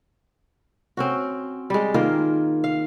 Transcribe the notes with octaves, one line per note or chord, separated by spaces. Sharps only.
C4 C#4 F#4
G3 G#3
D#3 A#3 F4 G#4
F5